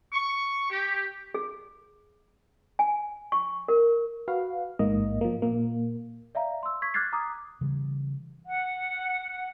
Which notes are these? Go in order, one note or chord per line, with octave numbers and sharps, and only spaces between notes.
C#6
G4
G#4
G#5
C#6
A#4
F#4 B4 F5
A1 G#2 A#3 D#5
F3 A#3
A#2 A#3
D5 E5 F5 A#5
C6 E6
C#6 G#6 B6
D6 F6 F#6 G#6 A6 C7
A#5 D6 D#6
C#3 E3 G3
F#5